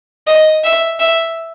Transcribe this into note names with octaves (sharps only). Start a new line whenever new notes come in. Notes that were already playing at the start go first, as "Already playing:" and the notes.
D#5
E5
E5